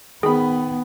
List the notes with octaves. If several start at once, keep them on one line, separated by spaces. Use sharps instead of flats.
D#3 B3 G#4 B5